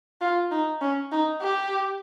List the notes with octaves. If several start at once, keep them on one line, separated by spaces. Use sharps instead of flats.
F4
D#4
C#4
D#4
G4